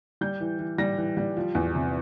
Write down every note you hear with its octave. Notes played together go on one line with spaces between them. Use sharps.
G3 G6
E3
E3
G3 A#6
E3
G3
F3
E2
C3